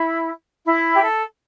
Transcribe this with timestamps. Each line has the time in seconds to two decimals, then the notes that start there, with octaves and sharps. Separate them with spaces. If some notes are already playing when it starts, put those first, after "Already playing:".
Already playing: E4
0.64 E4
0.93 G4
1.03 A4